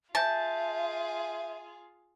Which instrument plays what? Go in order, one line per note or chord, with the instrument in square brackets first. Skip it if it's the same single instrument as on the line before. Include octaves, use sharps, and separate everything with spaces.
[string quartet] F4 G#4 [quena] E5 [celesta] G#5 G6 [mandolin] A5